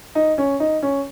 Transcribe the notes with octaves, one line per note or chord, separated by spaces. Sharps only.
D#4
C#4
D#4
C#4